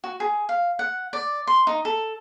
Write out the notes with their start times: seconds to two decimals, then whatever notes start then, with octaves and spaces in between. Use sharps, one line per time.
0.04 F#4
0.20 G#4
0.49 F5
0.79 F#5
1.13 D5
1.47 C6
1.67 D#4
1.85 A4